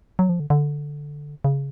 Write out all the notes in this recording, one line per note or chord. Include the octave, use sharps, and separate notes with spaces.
F#3
F3
D3
D3
C#3